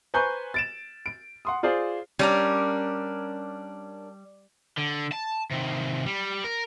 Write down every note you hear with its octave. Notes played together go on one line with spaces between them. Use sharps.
B4 C5 G#5 A#5 C#6 G6
A6 D7 E7
D7
F#5 C6 D#6
F4 G#4 C5 D5
G3 C#4 D4 A#4
D3
A5
C3 D#3
G3
A#4